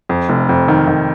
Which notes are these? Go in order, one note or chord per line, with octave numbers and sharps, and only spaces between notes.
F2
F1
F2
D#3
D#3